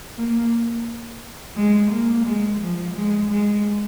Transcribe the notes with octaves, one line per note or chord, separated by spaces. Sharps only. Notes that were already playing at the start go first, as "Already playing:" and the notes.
A#3
G#3
A#3
G#3
F3
G#3
G#3